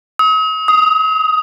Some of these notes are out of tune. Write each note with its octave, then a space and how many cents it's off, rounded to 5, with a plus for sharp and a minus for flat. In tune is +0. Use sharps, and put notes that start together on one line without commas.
D#6 +45
D#6 +10